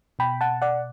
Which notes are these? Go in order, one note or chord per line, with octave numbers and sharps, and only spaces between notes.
B2 G5 B5
F#5 A5
D5 F#5